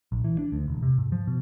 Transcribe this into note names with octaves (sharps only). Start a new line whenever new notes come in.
A#1
E3
D4
D2
E1
C3
G#2
F3
B2